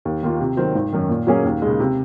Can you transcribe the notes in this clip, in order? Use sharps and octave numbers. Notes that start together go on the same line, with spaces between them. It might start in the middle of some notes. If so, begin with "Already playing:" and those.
D#2
D#3 A#3 F4
C3
D#3 F#3 C4
G#1
F#2 D#3
A#2
F#3 A#3 C#4 G#4
D#2
C#3 G#3
C3